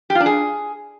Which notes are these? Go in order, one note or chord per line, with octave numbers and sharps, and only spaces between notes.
G4
F4
D4
G#4